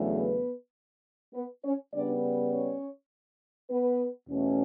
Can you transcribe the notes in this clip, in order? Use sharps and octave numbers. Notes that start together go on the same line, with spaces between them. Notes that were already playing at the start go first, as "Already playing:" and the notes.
Already playing: E2 C#3 F#3 A3 D4
B3 B4
B3 B4
C#4 C#5
C#3 G3 B3 D4 D5
C#4 C#5
B3 B4
E2 B2 A3 C#4